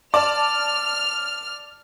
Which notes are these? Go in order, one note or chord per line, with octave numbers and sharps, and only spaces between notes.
D5 A5 F6